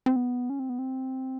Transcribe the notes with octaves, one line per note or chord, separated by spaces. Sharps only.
C4
B3
C#4
C4
B3
C4